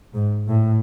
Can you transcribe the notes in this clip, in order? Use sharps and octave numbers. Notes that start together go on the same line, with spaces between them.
G#2
A2